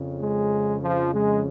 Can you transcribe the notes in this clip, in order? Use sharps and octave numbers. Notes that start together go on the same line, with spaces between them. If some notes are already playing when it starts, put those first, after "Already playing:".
Already playing: F2 C#3
G#3
F3
G#3